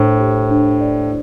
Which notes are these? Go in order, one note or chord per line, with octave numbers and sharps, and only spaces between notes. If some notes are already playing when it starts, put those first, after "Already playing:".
Already playing: A2 D4 C5
G4
D4
D5